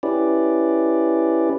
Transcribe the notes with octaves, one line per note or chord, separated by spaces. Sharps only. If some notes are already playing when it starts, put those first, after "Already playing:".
C#4 E4 G4 B4 D5